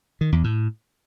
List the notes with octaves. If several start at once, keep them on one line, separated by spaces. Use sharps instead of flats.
D#3
E2
A2